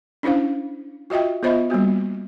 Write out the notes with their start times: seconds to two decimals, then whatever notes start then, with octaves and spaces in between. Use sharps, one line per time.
0.23 C#4 D4 E4 C5 F5
1.10 F4 F#4 D#5 E5 G5
1.43 B3 F4 C5 D#5 E5 B5
1.70 G3 A#3 B3 F#4